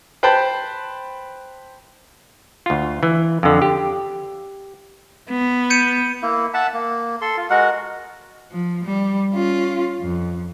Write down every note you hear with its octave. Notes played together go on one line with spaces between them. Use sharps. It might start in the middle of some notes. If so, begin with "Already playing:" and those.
B4 C5 G5 A5 B5
D2 F4
E3
F2 D3
G4
B3
G6 C#7 D#7
A#3 E4
E5 F#5 A5
A#3
A4 C6
F4
G#3 F#4 A#4 F#5
F3
G3
C#4 F4
F2